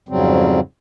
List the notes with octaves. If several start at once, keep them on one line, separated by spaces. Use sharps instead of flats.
F2 G#2 C#3 F#3 G3 C4